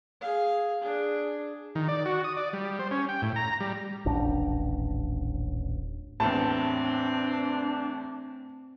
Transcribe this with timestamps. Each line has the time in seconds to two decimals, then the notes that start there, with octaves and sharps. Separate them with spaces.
0.21 G#4 F5
0.81 D4 G#4
1.75 D#3
1.88 D5
2.06 F#4
2.24 D#6
2.37 D5
2.53 G3
2.79 C5
2.91 C#4
3.09 G5
3.22 A2
3.36 A#5
3.60 G3
4.05 D#1 A1 D4
6.20 E2 A2 C4 D4 A5